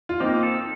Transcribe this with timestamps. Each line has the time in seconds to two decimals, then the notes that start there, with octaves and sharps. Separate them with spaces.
0.09 F4
0.20 A#3 C4 D#4
0.43 A4